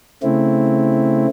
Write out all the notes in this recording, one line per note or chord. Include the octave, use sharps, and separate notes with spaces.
C#3 A3 C4 E4